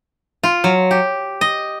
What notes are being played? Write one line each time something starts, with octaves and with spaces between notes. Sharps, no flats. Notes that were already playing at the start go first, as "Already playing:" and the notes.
F4
F#3
G4
D#5